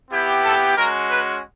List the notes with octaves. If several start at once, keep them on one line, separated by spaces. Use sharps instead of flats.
B3 E4 G4
A4
G#3 C#4 F#4 A#4
B4